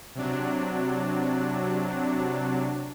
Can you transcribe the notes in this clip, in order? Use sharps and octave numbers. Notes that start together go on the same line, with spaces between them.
C3 F#3 D4